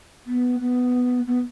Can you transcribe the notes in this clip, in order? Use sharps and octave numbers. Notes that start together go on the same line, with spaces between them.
B3
B3
B3